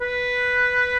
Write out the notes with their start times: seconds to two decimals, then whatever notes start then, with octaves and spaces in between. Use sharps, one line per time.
0.01 B4